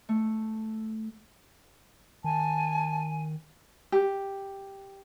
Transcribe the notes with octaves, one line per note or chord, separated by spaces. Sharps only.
A3
D#3 G#5 A5
G4